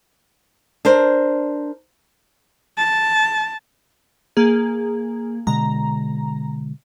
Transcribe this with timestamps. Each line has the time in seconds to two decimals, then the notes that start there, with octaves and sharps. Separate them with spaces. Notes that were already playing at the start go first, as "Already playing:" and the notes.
0.85 D4 A#4 C5
2.77 A5
4.37 A#3 G#4
5.47 B2 D3 G#3 A#5